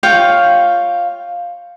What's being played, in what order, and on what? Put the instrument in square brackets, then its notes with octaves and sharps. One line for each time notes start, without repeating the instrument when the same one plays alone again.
[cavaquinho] F4 C#5 F5 G5